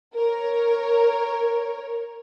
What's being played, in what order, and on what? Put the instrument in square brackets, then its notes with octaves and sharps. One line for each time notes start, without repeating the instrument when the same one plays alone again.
[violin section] A#4 C#5